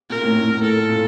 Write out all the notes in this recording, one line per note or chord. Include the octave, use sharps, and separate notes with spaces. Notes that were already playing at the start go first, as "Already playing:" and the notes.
A#2 A#4
A2
A2
A2
A4
A#2